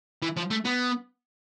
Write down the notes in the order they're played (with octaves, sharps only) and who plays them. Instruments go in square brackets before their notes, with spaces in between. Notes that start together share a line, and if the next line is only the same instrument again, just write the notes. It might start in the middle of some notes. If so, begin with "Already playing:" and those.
[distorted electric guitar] E3
F3
A3
B3